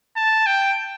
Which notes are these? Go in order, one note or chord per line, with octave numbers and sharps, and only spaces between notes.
A5
G5